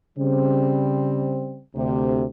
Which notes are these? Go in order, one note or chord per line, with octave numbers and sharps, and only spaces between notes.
C#3 G3 C4
D2 C3